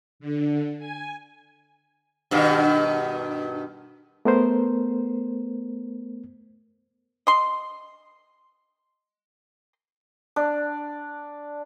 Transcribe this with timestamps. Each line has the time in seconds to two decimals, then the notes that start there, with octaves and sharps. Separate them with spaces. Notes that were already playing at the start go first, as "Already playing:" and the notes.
0.20 D3
0.79 G#5
2.31 G2 B2 D#3
4.25 A3 B3 A#4 C5
7.27 D#5 C6
10.36 D4